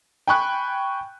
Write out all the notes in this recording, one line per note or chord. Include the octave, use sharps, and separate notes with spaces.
G5 G#5 B5 C#6 F#6